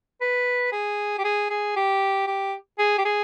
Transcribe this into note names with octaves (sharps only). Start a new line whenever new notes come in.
B4
G#4
G4
G#4
G#4
G4
G4
G#4
G4
G#4